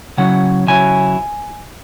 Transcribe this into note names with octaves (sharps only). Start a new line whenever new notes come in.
C#3 F#3 C#4 E4 F#5
C#3 F#3 C#4 E4 G#5